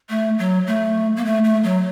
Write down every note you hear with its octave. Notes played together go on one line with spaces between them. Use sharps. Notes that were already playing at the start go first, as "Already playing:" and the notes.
A3
F#3
A3
A#3
A3
A3
F#3